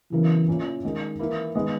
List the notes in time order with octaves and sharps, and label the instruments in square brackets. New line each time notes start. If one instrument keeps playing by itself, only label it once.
[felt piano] C#3 F#3 B3 E4 A#4 [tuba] E3
[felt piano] A#2 A#3 C#4 E4 A#4
D#3 G#3 D#4 A#4
E3 A#3 E4
D#3 G#3 B3